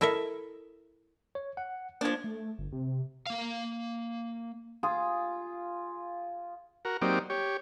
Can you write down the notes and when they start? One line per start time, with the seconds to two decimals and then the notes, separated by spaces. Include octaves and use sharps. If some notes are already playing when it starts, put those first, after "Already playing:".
0.01 E4 A4 A#4 D#5 E5
1.35 C#5
1.57 F#5
2.01 F3 A#3 D4 G#6
2.24 A3
2.59 G1
2.72 C3
3.26 A#3 F5
4.83 F4 G#4
6.85 F#4 A#4
7.01 F#3 A#3 C4 D#4 G4 D5
7.30 G4 C#5